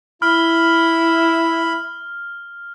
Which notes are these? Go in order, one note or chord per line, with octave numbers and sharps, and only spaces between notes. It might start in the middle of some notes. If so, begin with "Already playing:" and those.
E4 B5 F6